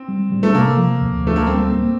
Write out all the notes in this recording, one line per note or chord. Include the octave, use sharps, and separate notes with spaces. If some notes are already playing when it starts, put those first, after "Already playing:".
Already playing: C4
G3
G3
A3
C3 A#3
F3
D2
D2 A3
A#3
G3 C4
A#3